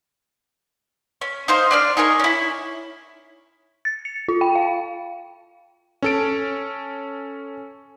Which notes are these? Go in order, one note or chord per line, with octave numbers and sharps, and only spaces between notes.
C#4
D#4 C5 F5
D4 D5 F6
D#4 G#4 A#4 C#6
C#4 E4
A6
C#7
F4
G5
F5
C#4 A4 D7